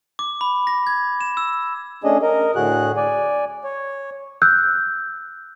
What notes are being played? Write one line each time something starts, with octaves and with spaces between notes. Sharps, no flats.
D6
B5
A#6
G#6
E7
E6
A3 C#4 D4 G#4 D#5
A#4 D#5
A2 D3 F#4 G#4 F#6
D5 G#5
C#5
E6 F#6 G6